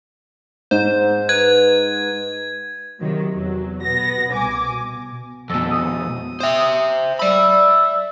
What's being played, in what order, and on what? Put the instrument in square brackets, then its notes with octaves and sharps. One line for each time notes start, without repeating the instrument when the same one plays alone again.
[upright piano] G#2 [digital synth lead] C5
[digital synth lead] B4 [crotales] G#6
[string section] C3 D#3 F#3
E2 F#3
B2 B3 A#6
C2 G#5 D6
B2
[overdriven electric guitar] F2 B2 [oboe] A4
[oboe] D#6
[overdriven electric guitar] C5 E5
[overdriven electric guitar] D5 B5 [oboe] E5